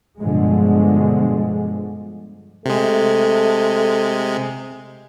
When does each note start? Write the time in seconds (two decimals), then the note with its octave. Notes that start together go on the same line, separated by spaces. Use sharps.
0.20 G2 B2 D3 F3 G#3
2.66 C3 G#3 A3